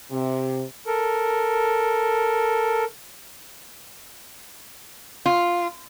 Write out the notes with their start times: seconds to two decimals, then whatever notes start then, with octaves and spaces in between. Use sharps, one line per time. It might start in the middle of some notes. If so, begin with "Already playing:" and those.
0.12 C3
0.87 A4 A#4
5.26 F4